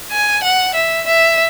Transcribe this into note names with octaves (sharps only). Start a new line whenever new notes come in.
G#5
F#5
E5
E5